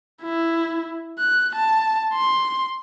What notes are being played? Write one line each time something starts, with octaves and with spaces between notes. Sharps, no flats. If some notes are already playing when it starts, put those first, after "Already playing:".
E4
F#6
A5
C6